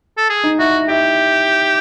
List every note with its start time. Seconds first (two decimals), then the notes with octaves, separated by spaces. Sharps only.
0.18 A4
0.30 G#4
0.44 D#4
0.59 E4 F#4
0.89 E4 G4